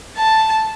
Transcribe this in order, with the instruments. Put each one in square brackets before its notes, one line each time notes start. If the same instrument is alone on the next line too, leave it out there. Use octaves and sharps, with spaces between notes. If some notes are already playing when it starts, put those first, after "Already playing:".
[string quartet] A5